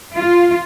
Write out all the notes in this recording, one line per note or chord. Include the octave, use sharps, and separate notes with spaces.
F4